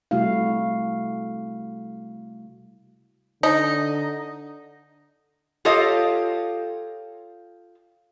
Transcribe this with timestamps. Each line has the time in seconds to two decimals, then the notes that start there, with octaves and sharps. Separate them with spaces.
0.11 C3 G3 A3 E4 F#4 F5
3.43 D3 D#4
5.65 F4 G4 A4 C#5 D#5 F5